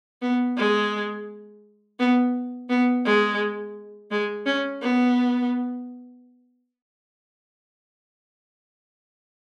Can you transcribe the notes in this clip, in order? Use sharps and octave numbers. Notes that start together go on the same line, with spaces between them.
B3
G#3
B3
B3
G#3
G#3
C#4
B3